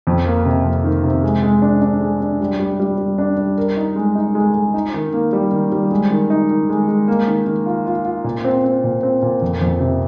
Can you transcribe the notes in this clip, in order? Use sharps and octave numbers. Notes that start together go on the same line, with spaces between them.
F2
A#3
C3
F2
D#3
C3
G#3
G#3
D4
D4
G#3
D4
G3
G3
G3
G3
D4
G3
A#4
D#4
G#3
D#4
G#3
G#3
D#4
D#3
A#3
G3
D#3
G3
G#3
D#3
D#4
D#3
G#3
G#3
A#3
D#3
D#3
F4
F4
F4
A#2
C4
C4
A#2
C4
A#2
F2
F2
C3